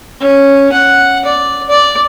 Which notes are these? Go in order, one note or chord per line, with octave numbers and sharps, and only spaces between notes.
C#4
F#5
D5
D5